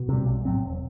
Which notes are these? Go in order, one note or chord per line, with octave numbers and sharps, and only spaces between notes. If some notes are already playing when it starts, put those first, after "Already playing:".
Already playing: B2
C3 G3
B1
A2 F#3 C4
E1